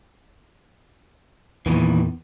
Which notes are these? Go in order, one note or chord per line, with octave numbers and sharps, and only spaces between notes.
E2 A#2 D#3 E3 B3